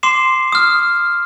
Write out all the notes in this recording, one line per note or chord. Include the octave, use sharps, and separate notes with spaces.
C6 D6 C7 E7
D#6 F6